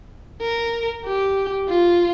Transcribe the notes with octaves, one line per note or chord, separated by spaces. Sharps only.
A#4
G4
F4